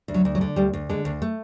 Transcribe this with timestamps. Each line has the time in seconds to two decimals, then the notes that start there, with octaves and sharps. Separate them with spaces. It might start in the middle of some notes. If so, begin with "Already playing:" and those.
0.08 D2
0.14 F#3
0.25 D2
0.35 F#3
0.41 D3
0.56 D2 G3
0.73 D2
0.89 D3 G#3
1.05 D2
1.22 A3